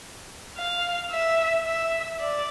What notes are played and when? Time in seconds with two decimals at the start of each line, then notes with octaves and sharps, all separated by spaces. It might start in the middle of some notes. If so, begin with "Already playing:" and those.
0.57 F5
1.11 E5
1.65 E5
2.19 D5